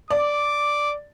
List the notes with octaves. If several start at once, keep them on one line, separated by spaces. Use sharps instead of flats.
D5 D6